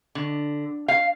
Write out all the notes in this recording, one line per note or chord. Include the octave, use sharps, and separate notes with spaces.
D3
F5